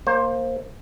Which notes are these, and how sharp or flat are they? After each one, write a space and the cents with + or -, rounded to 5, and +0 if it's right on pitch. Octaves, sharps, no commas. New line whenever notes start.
A#3 +0 C5 +20